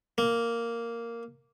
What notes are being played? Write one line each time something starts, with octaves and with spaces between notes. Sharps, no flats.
A#3